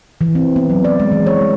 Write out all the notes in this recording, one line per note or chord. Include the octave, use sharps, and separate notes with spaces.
E3
C4
B3
F#3
D5
G#3
E3
C#5
G3